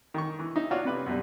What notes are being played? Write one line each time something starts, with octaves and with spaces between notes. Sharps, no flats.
D#3 C#6
E3
D#4 E5
D4 F4 F#4 C#5
C3 B4 D6
F#2 B2 G3